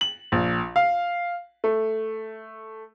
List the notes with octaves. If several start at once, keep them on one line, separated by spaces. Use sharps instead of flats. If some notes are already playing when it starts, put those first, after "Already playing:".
F#7
A#1
F5
A3